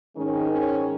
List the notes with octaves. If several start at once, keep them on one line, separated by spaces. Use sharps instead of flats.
G#2 D#3 G#3 C#4
C#4